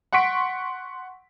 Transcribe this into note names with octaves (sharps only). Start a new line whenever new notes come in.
F#5 C6 C#6 B6 D7